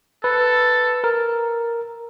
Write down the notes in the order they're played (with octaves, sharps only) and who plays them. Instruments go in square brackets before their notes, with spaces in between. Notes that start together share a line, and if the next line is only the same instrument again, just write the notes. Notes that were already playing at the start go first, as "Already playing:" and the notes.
[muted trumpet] A4 [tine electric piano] B4
[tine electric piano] A#4